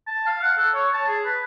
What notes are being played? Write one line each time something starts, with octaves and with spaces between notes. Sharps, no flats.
A5
F5
F#5
A4
C#5
A5
G#4
B4